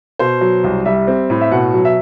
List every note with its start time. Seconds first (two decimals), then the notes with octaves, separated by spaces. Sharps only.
0.19 B2 C5
0.41 F#3
0.64 C2
0.85 G3 E5
1.07 C4
1.30 A2
1.41 E5
1.51 B2 F#5
1.74 F#3
1.85 E5